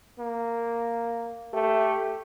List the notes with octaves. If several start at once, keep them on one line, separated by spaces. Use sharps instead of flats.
A#3
A3 G4